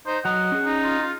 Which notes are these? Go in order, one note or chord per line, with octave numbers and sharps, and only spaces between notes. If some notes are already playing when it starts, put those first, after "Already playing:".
D#4 C5
F#3 D#5 F#5 A#5
C#4 G#4
D#4
F4
F4